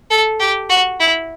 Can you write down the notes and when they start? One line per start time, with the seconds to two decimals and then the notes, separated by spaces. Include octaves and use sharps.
0.10 A4
0.40 G4
0.70 F#4
1.00 E4